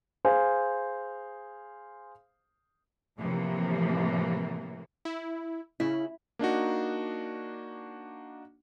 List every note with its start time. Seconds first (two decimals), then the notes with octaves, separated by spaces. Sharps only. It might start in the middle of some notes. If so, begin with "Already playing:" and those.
0.25 G#4 C5 F5 G#5
3.20 A2 C3 E3 F3 A#3
5.05 E4
5.80 C#3 E4
6.39 A#3 D4 D#4 F#4